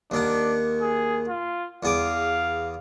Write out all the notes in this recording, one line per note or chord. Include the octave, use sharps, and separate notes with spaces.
D#2 D#3 D4 F#5
G#4
F4
E2 G#4 F5 D6